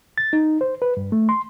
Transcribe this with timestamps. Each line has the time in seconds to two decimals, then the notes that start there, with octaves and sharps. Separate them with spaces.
0.18 A6
0.33 D#4
0.61 C5
0.82 B4
0.97 G2
1.12 A3
1.29 C6